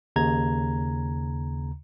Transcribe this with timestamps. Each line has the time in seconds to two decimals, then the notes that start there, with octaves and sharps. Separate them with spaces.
0.16 D#2 C#3 A#5 G#6